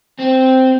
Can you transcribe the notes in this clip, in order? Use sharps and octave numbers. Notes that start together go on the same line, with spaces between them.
C4